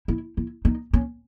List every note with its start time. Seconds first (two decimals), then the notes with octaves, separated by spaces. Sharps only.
0.08 E4
0.37 E4
0.65 D#4
0.93 C#4